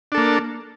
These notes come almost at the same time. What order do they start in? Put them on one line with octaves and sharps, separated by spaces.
D4 A4 A#3